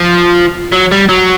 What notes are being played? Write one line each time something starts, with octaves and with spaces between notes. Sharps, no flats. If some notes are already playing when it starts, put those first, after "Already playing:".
Already playing: F3
F#3
G3
F#3